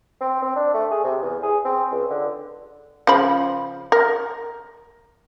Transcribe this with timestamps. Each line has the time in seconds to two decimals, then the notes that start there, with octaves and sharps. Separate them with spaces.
0.21 C4
0.42 C4
0.56 D4
0.74 A3
0.91 G#4
1.04 C3
1.22 E2
1.43 G#4
1.65 C4
1.92 C#2
2.10 D3
3.07 C#3 F3 B5
3.92 A#4